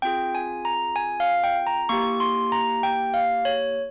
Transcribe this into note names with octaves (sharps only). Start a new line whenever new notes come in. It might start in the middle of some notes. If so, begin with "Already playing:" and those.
C4 F4 G#4 G5
G#5
A#5
G#5
F5
G5
A#5
A#3 E4 G4 C#6
C6
A#5
G5
F5
C#5